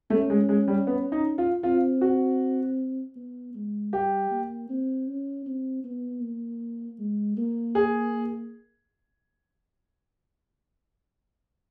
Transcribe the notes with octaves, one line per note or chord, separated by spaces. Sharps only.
A3 C#4
G#3
G#3
G3
B3
D#4
F4
C4 F4
F#4
B3
G#3
G3 G4
A#3
C4
C#4
C4
B3
A#3
G#3
A#3
G#4